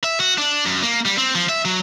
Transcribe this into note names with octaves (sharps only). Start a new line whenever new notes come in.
E5
F#4
D4
F#2
A#3
G3
C4
F3
E5
F#3